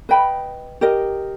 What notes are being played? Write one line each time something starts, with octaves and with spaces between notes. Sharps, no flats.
B4 D#5 G5 B5
G4 A#4 D#5